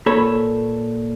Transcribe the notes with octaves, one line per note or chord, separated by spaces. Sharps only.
A#2 A4 B4 C#5 B5